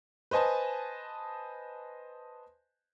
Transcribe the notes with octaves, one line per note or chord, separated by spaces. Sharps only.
B4 C5 D#5 G#5 A5